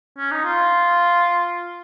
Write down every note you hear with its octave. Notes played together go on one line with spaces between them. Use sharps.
C#4
D#4
F4